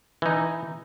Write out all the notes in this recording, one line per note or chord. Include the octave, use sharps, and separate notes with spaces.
E3 D#4